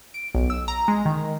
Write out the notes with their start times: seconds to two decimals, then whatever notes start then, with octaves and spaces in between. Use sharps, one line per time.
0.14 D7
0.35 B1
0.50 E6
0.68 A#5
0.88 G#3
1.05 D#3